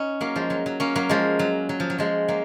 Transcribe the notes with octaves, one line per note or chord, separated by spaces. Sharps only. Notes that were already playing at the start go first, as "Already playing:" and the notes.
Already playing: C#4 D#4
F#3 A#3
F3 G#3
F#3
F#3
A#3 C#4
F#3 A#3
F3 G#3
F#3
F#3
F3
F#3
F3 G#3
F#3 A#3